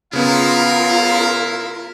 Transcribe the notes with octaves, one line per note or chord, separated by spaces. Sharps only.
C#3 B3 E4 F4 A#4 F5